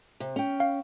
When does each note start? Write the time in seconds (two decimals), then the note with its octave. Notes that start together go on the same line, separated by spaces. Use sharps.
0.20 C3
0.36 C#4 G5
0.60 F5